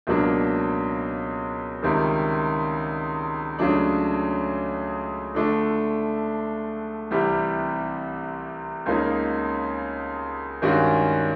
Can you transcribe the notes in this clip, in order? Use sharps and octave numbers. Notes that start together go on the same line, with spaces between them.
C#2 B2 F#3 A#3 D4
C#2 C3 D#3 G3
C#2 C#3 F#3 A3 D4
D3 F3 A3 D4
C2 C3 E3 G3
C#2 C#3 F3 A#3 D#4
G2 D#3 G#3 C#4 F#4